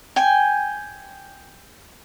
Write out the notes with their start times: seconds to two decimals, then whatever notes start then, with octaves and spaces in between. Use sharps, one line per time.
0.16 G5 G#5